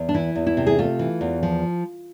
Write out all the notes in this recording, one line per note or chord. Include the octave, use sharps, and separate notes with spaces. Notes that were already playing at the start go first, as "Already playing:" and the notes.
Already playing: E2
D4
E3 E4
E2
E4
C3
G#4
A3 F4
E3
E2
F3